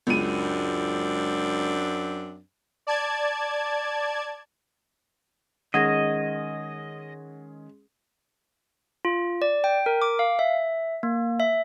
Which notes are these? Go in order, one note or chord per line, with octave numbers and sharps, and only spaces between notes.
C#2 F#2 C4 D4 D#7
D5 A5 G#6
D#3 G#3 C#4 G#4 D#5 F#5 G#6 A#6
F4
D5
G5
A#4
D6
F5
E5
A#3
E5